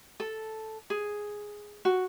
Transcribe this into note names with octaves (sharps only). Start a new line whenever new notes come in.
A4
G#4
F#4